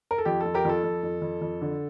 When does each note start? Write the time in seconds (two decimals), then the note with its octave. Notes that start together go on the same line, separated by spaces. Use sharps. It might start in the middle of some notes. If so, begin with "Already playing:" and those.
0.11 A#4
0.18 A4
0.25 F2 G4
0.40 A4
0.46 F2
0.54 G4 A#4
0.65 F2 A4
0.84 F2
1.03 F2
1.22 F2
1.41 F2
1.61 D3